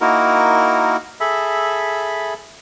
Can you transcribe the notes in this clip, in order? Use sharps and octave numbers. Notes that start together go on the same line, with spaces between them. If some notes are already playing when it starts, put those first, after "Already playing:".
A#3 D#4 E4 F#4 A#4
G#4 A4 E5 B5